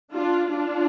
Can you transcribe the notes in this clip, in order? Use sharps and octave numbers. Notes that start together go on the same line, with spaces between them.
D4 F4
D4 F4